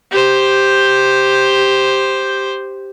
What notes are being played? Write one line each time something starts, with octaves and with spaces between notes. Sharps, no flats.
G4 C5